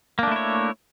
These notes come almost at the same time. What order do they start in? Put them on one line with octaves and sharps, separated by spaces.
A#3 D4 A3 E4 C#5